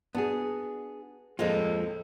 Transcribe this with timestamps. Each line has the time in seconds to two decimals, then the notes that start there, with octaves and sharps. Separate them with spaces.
0.15 B3 D4 F#4 G#4
1.39 F2 A2 G#3 A#3 C4 F4 A4 D#5